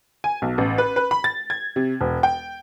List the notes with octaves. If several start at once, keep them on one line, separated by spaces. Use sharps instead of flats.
G#5
B1
A1
B4
B4
B5
A6
G#6
C3
E1
G5